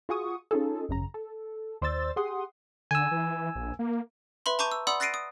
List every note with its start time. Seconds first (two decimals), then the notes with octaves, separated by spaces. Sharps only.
0.09 F4 F#4 G#4 C#6 D#6
0.51 C#4 D#4 F4 G#4 A4
0.89 G#1 F#2 C#3 A#5
1.14 A4
1.82 D#2 C5 D5 C6 E6 A6
2.16 G4 G#4 F#5 C6 D#6
2.91 D3 G#5 E6
3.11 E3
3.55 A#1
3.79 A#3
4.46 B4 E5 B5 C6
4.59 A5 A#5 C#6 D6 G6 D#7
4.72 E6
4.87 D5 F#5 B5 C6 D#6 E6
5.00 F#6 A6 A#6 C7 D7 D#7
5.14 D#6